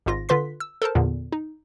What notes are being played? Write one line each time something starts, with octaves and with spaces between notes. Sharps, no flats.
G#1 G#2 F4 A#6
D3 F4 B4 C6 B6
E6
A4 A#4 C5 A5
E2 A#2 D3
D#4